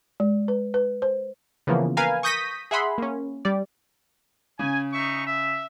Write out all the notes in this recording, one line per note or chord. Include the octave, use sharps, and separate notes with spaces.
G#3
B4
B4
C5
C#3 E3 F3 A#3 B3
A#4 B4 F5 G#5 A#5
C#6 D#6 G6 A#6 B6 D#7
G#4 E5 F#5 B5 C6
A#3 C#4
G3 D5
C#3 G#5
D#4 E5 C#6
E5